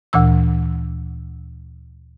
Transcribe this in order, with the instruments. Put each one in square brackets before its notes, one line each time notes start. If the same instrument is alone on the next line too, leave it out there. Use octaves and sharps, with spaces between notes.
[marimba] D2 A#2 E3 E6